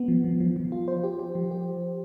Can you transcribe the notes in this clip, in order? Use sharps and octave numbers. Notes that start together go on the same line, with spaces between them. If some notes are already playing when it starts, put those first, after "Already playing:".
Already playing: B3
F3
F3
F3
F3
F4
C5
G4
G4
F3
G4